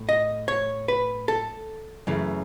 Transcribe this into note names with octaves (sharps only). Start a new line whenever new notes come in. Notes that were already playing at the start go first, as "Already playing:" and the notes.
Already playing: A2
D#5
C#5
B4
A4
F#2 C#3 E3 A3